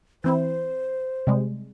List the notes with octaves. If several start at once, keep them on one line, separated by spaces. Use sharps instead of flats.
E3 C4 E4 C5
C3 G3 G#3